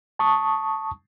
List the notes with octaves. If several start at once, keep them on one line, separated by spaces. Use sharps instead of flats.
A5 C#6 D#6